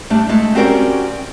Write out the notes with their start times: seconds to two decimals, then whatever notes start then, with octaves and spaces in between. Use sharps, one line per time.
0.10 G3 A3 D4
0.29 G#3 A3 E5 A5
0.55 C4 C#4 F#4 G4 A#4 D5